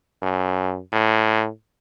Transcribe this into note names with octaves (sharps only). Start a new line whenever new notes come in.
F#2
A2